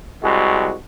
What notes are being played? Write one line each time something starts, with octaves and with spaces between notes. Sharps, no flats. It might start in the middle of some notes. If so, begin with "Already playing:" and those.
C2 G#3 F#4